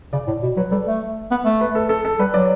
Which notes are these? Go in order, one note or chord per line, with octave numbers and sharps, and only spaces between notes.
C#3 D5
A2
B2
F#3 B4
G3 A4
A3
B3
A3
B4
A4
A4
A4
G3 B4
F#3 D5